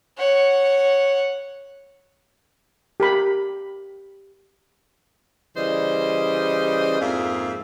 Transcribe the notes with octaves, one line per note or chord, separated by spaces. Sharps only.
C#5 F#5
G4 A#4 B5
C#3 E3 G3 C5 D#5
F2 G#2 A#3 G#4 E5 F5